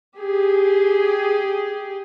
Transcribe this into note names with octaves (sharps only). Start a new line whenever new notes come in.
G4 G#4